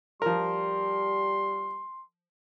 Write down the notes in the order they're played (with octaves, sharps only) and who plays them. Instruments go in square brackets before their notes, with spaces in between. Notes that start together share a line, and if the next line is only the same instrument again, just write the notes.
[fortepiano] F3 A#4 [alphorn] G3 [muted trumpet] C6